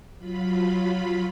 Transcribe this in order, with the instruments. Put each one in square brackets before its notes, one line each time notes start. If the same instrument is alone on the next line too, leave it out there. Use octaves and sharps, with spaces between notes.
[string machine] F#3 F4 B5